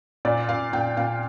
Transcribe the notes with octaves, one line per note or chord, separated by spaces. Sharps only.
A#2 D5
A#2 F5
A#2 G5
A#2 F5